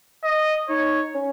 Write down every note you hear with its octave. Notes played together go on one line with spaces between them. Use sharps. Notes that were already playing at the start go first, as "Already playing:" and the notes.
D#5
D#4 C#5
C#4